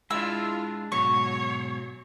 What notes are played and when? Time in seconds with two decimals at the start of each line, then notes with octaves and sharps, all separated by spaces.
0.10 G#3 D4 E4 F4 E6
0.92 G#2 B2 F#3 C#5 C#6